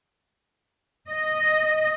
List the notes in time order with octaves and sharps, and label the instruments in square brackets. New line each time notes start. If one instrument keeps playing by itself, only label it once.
[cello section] D#5